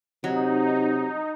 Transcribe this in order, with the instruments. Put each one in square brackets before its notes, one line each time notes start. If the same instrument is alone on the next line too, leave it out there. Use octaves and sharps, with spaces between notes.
[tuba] C3 [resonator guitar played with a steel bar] F#3 [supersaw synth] D#4